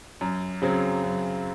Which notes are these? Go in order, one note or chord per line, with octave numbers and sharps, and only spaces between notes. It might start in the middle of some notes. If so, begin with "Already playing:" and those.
F#2
C#3 F#3 C4
F#2